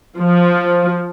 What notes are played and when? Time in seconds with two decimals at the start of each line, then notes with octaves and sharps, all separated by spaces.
0.19 F3